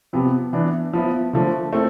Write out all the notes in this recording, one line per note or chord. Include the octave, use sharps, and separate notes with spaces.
C3 F3 B3
E3 B3 D4
F3 B3 E4
D3 F3 A3
A3 C4 E4 A4